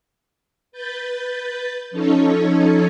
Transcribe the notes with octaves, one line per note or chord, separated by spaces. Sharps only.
B4 G6 A6
F3 C#4 D#4 A4 C#5